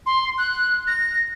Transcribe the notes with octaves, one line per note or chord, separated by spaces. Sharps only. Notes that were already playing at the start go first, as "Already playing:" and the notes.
C6
F#6
A#6